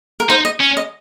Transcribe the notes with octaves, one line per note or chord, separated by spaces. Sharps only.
A#4
D#4 C5
D#5
C#4
D#5